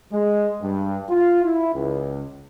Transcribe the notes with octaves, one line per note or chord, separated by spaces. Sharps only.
G#3
G2
F4
E4
C#2